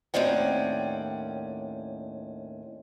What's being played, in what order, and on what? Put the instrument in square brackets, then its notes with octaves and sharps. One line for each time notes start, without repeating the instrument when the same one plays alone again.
[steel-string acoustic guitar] D#2 A2 C4 C#4 D5 F#5